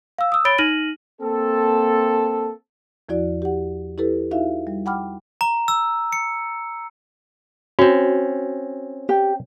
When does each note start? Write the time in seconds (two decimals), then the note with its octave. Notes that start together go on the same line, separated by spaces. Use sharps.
0.18 F5 E6
0.32 D#6 E6
0.45 C#5 B5 A6 D7 G7
0.58 D#4 F6 A#6 D#7 F#7
1.22 A#3 C4 A4
3.09 E2 F3 E4 F#4 D5
3.42 G4 F#5
3.98 E4 G4 A4 B4
4.31 D#4 E4 F#4 E5 F5
4.67 G3
4.86 F#5 G5 B5 D6 F6
5.41 A#5
5.68 E6
6.13 C#7
7.79 C4 C#4 F#4
9.09 G4